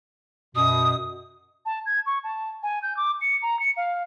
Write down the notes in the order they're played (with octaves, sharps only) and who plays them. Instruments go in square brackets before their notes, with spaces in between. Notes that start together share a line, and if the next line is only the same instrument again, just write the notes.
[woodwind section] F#2 B2 [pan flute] D#6
[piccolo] A5
G#6
C#6
A5
G#5
G6
D6
C#7
A#5
C#7
F5